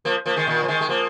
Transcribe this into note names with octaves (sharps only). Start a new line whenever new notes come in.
F3 A#3
F3 A#3
D#3 G#3
A#2 D#3
F3
D#3 G#3
G#3
F3 A#3